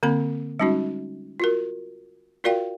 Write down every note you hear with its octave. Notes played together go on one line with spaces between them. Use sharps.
D3 A#3 C4 B5
G3 G#3 C#4 D#4 F#4
F4 F#4 A#4
F4 F#4 A#4 D5 F5 G5